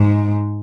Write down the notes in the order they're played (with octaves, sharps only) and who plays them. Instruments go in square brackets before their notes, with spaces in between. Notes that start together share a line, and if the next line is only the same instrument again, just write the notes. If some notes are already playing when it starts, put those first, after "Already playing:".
Already playing: [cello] G#2